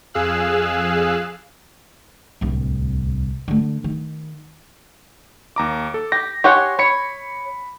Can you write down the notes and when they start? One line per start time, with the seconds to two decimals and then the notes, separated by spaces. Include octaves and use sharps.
0.14 F2 G#4 F5 E6 F#6
2.41 D1 C2
3.48 D3 A3
3.84 D#3
5.56 D#2 A#5 D6
5.94 A4
6.12 G4 A#6
6.44 G4 C#5 F#5 G#5 C6 C#6
6.79 C#5 B5 C#7